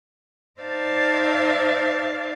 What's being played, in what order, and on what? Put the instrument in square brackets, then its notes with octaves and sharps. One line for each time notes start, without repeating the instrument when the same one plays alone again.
[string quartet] D#4 C5 D5 E5 F5 A5